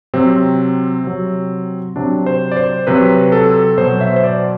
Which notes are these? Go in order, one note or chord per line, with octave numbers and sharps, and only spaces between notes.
C3 F#3 C4
C3 F#3
C3 F#3 D4
C5
D5
C5
C3 F#3 B4
A4
B2 F#3 C5
E5
C5
D5